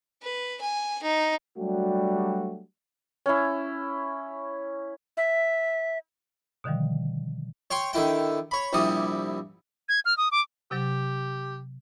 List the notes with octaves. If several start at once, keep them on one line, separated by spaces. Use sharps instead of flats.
B4
G#5
D#4
F#3 G3 A3 D4 F#4 G4
C#4 E4
E5
B2 D3 D#3 F3 G3
C#5 G5 C6 C#6
D3 D#3 E4 G5
C#5 B5
A#1 C3 G3 E4 D#6
G#6
F6
D#6
D6
C3 F#3 G4